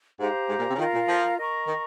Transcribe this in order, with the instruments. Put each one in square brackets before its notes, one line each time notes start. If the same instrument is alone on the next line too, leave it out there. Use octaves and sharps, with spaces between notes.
[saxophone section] G#2 [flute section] G4 C5 F5 A#5
[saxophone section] G#2
A#2
C3
C#3
[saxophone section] D#3 [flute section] F4 A#4 F5 A#5
[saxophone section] A#2
F3
[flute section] A#4 D#5 A#5 C#6
[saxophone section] D#3